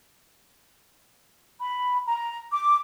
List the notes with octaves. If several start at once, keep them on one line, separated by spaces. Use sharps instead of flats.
B5
A#5
D6